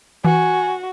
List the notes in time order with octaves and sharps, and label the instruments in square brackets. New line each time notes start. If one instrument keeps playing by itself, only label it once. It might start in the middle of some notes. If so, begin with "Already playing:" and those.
[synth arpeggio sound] E3 [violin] F#4 [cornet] G#5